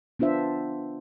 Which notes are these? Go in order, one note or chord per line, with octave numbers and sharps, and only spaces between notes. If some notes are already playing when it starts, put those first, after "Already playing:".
B3 D4 F4 C5 E5